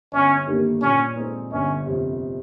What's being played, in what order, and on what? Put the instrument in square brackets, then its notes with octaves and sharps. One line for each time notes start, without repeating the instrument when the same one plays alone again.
[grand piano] G1 [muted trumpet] C#4
[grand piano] G2 D#3 G3 A#3
[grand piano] A#2 [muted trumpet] C#4
[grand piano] G#3 C4 D#4
[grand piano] G1 [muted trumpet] C#4
[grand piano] F2 C3